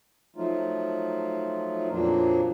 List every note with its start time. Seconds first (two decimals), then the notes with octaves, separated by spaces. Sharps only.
0.36 F3 F#3 A3 D#4 F4
1.91 F2 A#2 F3 F#3 A#3 D4